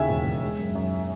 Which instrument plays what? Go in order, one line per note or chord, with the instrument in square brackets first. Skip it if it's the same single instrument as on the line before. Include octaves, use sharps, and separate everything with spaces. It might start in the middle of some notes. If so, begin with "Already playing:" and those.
Already playing: [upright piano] D#2 C#3 E5 G#5
E1
E1
G#3
F#2
F#2